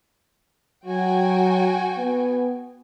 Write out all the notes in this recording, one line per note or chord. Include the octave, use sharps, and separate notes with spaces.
F#3 F#4 G5 G#5
B3